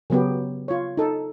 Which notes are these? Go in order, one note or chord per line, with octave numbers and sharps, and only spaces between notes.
C#3 F#3 B3 G4
F4 C#5
D#4 A4